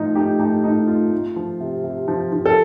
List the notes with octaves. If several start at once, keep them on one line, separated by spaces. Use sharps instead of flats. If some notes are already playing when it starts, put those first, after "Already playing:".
Already playing: A2 F3 D#4 F4
A3 D#4 G4
A3 D#4 G4
A2 D#4
A3 F4
A3
F3
C3
C3
F3
F3
A4